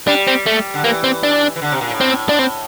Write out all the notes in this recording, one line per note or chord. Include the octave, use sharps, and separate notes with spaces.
G3 D4
C4
A3
D3
E3 A#3
C4
D4
E3
D3
C3
A#2
A2
C4
D4
C4